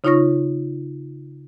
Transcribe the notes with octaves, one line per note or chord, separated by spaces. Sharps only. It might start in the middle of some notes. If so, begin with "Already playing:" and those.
C#3 D#4 F4 C#5 C#6 A#6